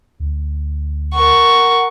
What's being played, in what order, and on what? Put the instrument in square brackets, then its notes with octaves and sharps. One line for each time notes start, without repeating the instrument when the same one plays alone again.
[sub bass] D2
[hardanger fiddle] A#4 C#6 [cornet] F#5